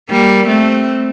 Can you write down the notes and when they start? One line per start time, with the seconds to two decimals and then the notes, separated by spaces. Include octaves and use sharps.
0.10 G3 A#3
0.48 A3 C4